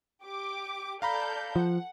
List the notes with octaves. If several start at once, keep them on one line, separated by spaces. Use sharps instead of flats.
G4 D6
A4 D5 F5 A#5 B5 G6
F3 F#5